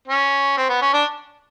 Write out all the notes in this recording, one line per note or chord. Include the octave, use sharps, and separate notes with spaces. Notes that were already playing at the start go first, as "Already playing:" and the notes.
C#4
C4
B3
C#4
D4